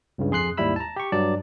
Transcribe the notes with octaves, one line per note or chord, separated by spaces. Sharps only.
C#2 G2 C#3
F2 G#4 C6 F#6 C7
D#2 G#2 G3 E4 B5 E6
A5 A#5
G4 C#6
G2 F#3 D5 A5